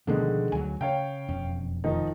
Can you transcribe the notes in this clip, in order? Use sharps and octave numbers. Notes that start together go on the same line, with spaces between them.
B2 D3 D#3 F3 G#3 B3
D2 F#3 G#5
C#3 C#5 F5 G5
E1 F2 C#4
D#3 F3 D#4